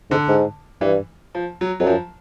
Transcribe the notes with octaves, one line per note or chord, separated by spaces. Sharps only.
G#2 D3
G#2
G2 E3
F3
F#3
F2 F#3
F#2 F3